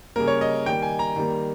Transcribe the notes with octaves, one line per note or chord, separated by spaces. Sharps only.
C#3 G3 A#3 A#4
C#5
D#5
D#3 G3 A#3 G5
G#5
A#5
D#3 G3 A#3